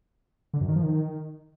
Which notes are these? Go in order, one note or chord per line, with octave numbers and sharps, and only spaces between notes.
D3
F#2
D#3
F3
D#3